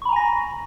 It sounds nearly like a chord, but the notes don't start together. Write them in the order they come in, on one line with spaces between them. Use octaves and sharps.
C#6 B5 A#5 G#5 A#6